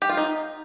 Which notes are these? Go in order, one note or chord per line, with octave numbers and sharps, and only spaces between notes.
G4
F4
D#4